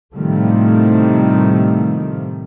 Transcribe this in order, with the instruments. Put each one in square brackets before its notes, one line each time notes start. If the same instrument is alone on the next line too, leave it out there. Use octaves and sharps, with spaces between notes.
[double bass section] A2 C3 D#3 F3 G3 A3